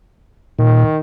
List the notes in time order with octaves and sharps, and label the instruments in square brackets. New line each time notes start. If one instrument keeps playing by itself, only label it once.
[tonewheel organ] A#2 [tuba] D#3